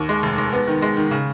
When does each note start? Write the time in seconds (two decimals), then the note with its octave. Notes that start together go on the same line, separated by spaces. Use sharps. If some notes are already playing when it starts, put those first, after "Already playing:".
Already playing: D#2
0.09 G#3
0.23 F1
0.38 G#3
0.53 B3
0.68 D#3
0.82 G#3
0.97 D#3
1.11 C#3